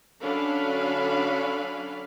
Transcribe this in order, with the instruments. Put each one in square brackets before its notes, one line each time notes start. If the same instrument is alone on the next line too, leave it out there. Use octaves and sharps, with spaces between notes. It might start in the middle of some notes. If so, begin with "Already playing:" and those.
[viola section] D3 F#3 C#4 D4 F5 B5